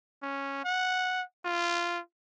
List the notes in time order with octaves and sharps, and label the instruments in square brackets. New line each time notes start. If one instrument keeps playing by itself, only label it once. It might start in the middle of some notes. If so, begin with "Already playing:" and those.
[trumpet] C#4
F#5
F4